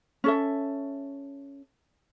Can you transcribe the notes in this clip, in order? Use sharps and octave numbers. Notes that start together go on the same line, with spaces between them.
C#4 A4 E5